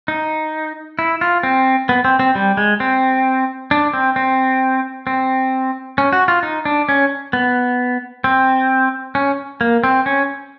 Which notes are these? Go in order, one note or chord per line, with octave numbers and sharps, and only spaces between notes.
D#4
E4
F4
C4
B3
C4
C4
G3
G#3
C4
D4
C4
C4
C4
C#4
F#4
F4
D#4
D4
C#4
B3
C4
C#4
A#3
C4
C#4